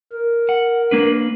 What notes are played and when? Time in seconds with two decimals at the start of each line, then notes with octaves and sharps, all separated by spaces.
0.12 A#4
0.49 F#5
0.91 A#3 D4 B4